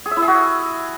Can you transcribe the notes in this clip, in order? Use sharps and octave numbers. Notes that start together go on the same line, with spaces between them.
G#4
E5
E4
G#4
F#4